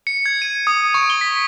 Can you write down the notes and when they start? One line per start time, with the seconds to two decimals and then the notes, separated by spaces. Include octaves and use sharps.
0.07 C#7
0.26 G#6
0.42 D#7
0.67 D#6
0.94 C#6
1.10 G7
1.21 B6